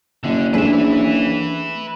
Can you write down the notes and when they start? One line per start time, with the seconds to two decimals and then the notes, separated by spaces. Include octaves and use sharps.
0.24 F#1 D3
0.54 A3 C4 D4 G#4 B4 E5